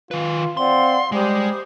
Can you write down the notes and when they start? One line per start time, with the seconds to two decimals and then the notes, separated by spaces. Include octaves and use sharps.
0.11 D#3 F4 B4
0.57 C4 D5 F5 F#5 C6
1.12 G3 G#3 C5 D6 D#6